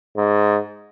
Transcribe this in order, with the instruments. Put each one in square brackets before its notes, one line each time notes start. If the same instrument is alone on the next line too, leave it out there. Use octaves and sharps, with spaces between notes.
[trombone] G#2